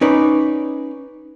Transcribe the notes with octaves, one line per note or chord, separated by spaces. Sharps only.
C#4 D#4 B4 D5